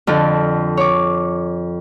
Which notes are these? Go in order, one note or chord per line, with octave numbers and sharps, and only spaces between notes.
F2 D3 F4 A4
C#5 D6